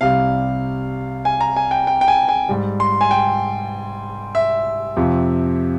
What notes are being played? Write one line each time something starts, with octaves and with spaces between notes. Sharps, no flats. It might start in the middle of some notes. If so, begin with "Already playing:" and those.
C2 C3 G3 F5
G#5
A#5
G#5
G5
G5
G5
G#5
G#5
G#2 G3
C6
G#5
G5
E5
F2 C3 F3